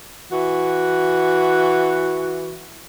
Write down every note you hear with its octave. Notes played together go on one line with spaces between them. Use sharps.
E3 F#4